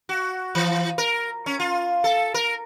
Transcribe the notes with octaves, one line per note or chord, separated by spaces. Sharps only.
F#4
E3
A#4
C#4
F4
A4
A#4